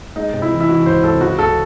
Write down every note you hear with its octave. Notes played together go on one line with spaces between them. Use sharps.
G#3 D#4
C3
E4
E3
E4
E3 F#4
C#2 C5
C3 A4
C#2 F#4
C#2 A4